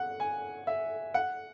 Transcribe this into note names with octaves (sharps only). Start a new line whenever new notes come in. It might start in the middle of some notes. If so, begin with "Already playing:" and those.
Already playing: F#5
G#5
E5
F#5